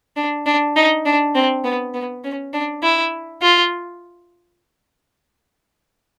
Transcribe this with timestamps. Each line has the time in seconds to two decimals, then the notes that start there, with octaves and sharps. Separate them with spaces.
0.16 D4
0.46 D4
0.76 D#4
1.05 D4
1.35 C4
1.65 B3
1.94 B3
2.24 C#4
2.53 D4
2.83 E4
3.42 F4